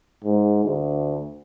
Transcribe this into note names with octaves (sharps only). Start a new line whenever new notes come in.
G#2
D2